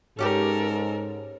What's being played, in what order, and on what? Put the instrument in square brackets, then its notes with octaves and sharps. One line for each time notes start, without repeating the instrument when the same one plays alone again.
[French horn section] G#2 [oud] C#4 G4 D5 [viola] A4 A#4